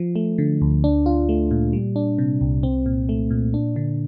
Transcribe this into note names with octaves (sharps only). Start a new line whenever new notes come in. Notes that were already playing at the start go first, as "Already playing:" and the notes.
Already playing: F3
A3
D3
D2
D4
F4
A3
A#2
G3
D4
C3
C2
C4
A#2
A3
A#2
D4
D3